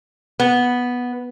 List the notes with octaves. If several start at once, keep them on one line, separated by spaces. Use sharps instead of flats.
B3